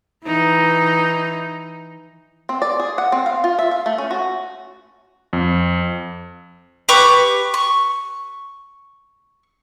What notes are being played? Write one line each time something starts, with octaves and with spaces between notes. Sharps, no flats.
E3 D#4
C4
D5
G#4
F#5
C4
F5
F4
E5
F5
A3
C#4
F#4
F2
G4 B4 C#6 D6
C#6